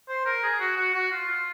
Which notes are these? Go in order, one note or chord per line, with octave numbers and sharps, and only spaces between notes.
C5
A#4
G#4
F#4
F#4
F#4
F4
F4